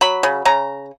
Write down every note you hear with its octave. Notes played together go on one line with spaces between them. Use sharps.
F#3 B5
C#3
C#3 A#5